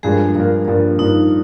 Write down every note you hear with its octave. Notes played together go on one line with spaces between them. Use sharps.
G2 F3 G#3 A#3 G#4
G2 F3 A#3
G2 F3 A#3
G2 F3 A#3 D#4